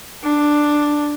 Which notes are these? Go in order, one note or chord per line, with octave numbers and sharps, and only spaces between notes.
D4